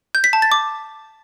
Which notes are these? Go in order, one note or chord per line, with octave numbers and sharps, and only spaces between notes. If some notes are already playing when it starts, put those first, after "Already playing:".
G6
B6
A5
A6
D6